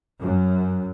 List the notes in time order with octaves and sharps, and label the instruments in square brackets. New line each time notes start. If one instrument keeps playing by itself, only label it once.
[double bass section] F#2